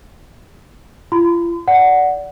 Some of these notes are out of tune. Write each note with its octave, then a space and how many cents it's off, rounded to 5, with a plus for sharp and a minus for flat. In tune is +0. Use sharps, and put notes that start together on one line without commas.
F4 -40 C6 -45
D5 -15 F#5 +0